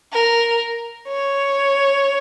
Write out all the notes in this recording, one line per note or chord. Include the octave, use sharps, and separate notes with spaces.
A#4
C#5